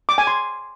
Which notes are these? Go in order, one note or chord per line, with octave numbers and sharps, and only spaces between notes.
D6
G#5
C6